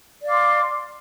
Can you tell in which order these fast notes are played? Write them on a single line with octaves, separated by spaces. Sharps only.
D5 F5 D6 C6